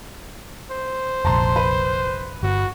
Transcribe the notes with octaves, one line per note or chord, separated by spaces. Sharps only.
C5
F1 A#1 A5 A#5 C6
B4
G1 F#4